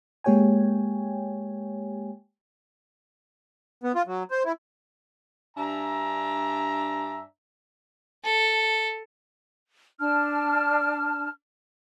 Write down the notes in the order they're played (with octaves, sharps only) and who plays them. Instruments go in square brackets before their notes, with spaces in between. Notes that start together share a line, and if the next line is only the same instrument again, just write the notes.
[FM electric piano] G#3 A#3 G4 C#5 G5 G#5
[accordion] B3
F4
F#3
C5
E4
[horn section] G2 D4 E5 G#5 A#5
[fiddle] A4
[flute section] D4 A5 F6